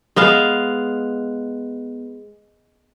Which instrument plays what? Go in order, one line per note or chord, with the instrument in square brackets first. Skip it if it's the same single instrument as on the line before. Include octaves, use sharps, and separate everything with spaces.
[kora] G#3 B3 F5